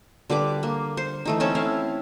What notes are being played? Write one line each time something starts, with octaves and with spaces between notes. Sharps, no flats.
D3 G3 B4 D6
A#3
C5
E3 A3 D#4
A3 C4 C#4 A5
E4 F5